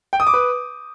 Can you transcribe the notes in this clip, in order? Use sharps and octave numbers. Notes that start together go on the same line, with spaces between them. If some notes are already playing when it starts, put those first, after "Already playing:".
G5
D#6
D6
B4